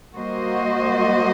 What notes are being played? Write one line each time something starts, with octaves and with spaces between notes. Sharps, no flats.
G3 A#3 F#4 C5 D#5